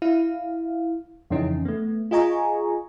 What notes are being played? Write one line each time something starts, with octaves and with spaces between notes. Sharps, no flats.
E4 F5
F2 C#3 E3 C#4 D#4
A3 B3
F4 G#4 D#5 G#5 A#5 C#6